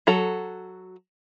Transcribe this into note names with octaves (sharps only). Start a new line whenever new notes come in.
F#3 F#4 A4 A#5